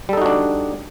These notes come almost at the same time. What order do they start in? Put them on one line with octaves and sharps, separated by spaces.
G3 A4 D#4 F#4 D4